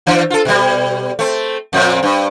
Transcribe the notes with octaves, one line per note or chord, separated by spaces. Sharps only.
E3 D4
F4 A4
B2 G3
A3 C4
F2 A#2 C4
G2